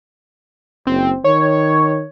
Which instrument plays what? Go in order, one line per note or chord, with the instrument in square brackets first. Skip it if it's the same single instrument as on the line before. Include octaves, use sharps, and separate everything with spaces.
[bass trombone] F#1 [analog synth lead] C4
[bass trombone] D#3 [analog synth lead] C#5